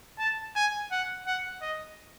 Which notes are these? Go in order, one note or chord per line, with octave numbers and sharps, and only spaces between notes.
A5
G#5
F#5
F#5
D#5